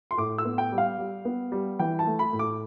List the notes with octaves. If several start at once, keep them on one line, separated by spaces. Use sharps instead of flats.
C6
A2 D6
E6
B3
G5
G3
F5
G3
B3
G3
E3 G5
A5
A3
B5
A2
D6